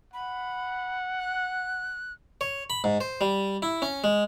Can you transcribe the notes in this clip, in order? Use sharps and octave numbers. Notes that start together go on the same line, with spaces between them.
F#5 B5
F#6
C#5
B5
G#2
C5
G3
E4
C#4
G#3